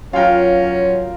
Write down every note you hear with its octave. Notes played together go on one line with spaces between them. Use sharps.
F#3 C#4 F4 A#4 F5 G5